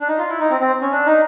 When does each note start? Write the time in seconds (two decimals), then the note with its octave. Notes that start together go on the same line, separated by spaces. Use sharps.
0.01 D4
0.08 D#4
0.18 F4
0.29 E4
0.40 D#4
0.50 C4
0.61 C4
0.81 C#4
0.92 D4
1.06 D#4